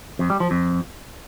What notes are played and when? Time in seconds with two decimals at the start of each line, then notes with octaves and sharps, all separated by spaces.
0.19 F2
0.30 G3
0.40 F3
0.51 F2